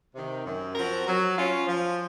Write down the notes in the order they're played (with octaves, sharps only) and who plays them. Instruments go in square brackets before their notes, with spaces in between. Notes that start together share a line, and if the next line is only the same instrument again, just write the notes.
[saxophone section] C3 D#3
F#2
F3 C4 F#4 A#4
F#3
C#4 F4
F3